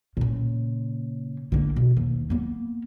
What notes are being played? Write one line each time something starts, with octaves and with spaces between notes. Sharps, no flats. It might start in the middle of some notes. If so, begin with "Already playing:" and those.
A#2 C#3
D3 A#3
B2
D#2
A#3 B3